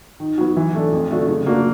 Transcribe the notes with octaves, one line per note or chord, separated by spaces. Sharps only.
D#3
F#3 B3
E3
A3 D4
F2
D3 F#3 A3 D4
C#3
F#3 A#3 D4